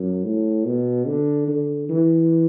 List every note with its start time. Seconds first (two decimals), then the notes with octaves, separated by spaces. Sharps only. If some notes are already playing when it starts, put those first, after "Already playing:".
Already playing: F#2
0.25 A2
0.66 B2
1.07 D3
1.48 D3
1.89 E3